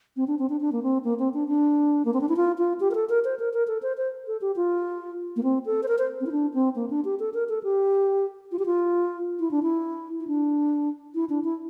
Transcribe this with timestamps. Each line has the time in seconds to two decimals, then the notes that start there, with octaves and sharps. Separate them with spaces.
0.16 C4
0.28 D4
0.39 C4
0.50 D4
0.61 D4
0.72 A#3
0.83 C4
1.04 A#3
1.19 C4
1.34 D4
1.48 D4
2.05 A#3
2.14 C4
2.21 D4
2.29 E4
2.37 F4
2.58 F4
2.80 G4
2.91 A#4
2.95 A4
3.09 A#4
3.25 C5
3.39 A#4
3.53 A#4
3.68 A4
3.82 C5
3.97 C5
4.27 A4
4.41 G4
4.56 F4
5.36 A#3
5.43 C4
5.66 A4
5.83 C5
5.88 A#4
5.99 C5
6.21 C4
6.26 E4
6.32 D4
6.54 C4
6.75 A#3
6.90 D4
7.05 G4
7.20 A4
7.34 A#4
7.49 A4
7.63 G4
8.52 F4
8.59 G4
8.66 F4
9.39 E4
9.51 D4
9.63 E4
10.20 E4
10.27 D4
11.15 E4
11.29 D4
11.44 E4